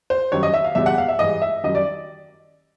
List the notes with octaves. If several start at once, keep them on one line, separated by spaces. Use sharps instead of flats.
C5
F#2 D#3 G3 C#5
D#5
E5
F5
E2 B2 G3 E5
F#5
F5
E5
G#2 E3 G3 D#5
E5
F#2 D#3 G3 D#5
D5